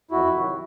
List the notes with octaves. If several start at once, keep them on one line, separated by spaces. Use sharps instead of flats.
F2 E4 F#4
C3 D#3 F#3